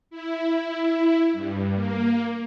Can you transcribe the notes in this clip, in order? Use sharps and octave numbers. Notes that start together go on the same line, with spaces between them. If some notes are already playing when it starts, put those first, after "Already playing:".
E4
G2
A#3